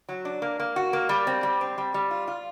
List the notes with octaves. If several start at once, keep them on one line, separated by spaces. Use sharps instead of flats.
F#3
D4
A#3
A#3
F#4
A#3
G3
C4
G3
C4
G3
G3
F4
F4